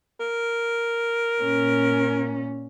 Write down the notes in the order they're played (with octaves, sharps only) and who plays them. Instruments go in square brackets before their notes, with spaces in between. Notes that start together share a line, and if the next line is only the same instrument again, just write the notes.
[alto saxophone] A#4
[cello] A#2 C#4